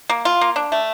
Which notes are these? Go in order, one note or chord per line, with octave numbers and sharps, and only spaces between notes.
A#3
F4
A#3
D4
A3